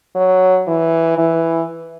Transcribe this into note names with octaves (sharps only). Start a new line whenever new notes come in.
F#3
E3
E3